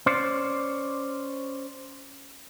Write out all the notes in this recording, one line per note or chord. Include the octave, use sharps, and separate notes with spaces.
C#4 C5 D5